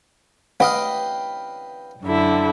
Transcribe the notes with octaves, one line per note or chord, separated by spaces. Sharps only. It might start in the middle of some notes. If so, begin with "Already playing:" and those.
B4 D#5 F5 G5
F#2 D3 E4